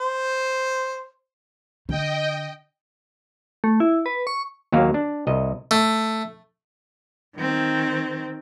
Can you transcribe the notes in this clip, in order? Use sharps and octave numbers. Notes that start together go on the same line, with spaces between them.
C5
D3 D#5 G5
A3
E4
B4
C#6
D#2 F#3 A#3 F5
D4
C2 D#5
A3
D#3 C4